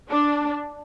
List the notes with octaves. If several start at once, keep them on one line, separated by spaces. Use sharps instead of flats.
D4